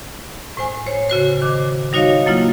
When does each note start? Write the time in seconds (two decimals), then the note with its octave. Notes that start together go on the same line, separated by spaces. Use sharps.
0.57 A2 C5 G#5
0.86 C5 C#5
1.09 C#3 F#4 C5
1.42 D#3 D6
1.93 G3 D#4 F#4 C#5 D#5 F5
2.26 F#3 A#3 E4 F4